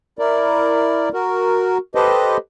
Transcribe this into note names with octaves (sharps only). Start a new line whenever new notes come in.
E4 A#4 D5
F#4 A#4
G4 A4 B4 C5 D#5